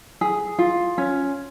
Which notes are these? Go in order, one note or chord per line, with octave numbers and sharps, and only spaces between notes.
G#4
F4
C#4